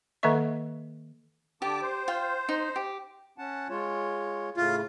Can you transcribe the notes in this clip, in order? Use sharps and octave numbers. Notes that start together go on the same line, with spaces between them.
D#3 A#3 A4 D#5 E5 C#6
D3 G4 A5 D6
C5
F4 G5
D#4
G4
C#4 F#5 A5
G#3 F4 C#5
A2 C#3 A3 F4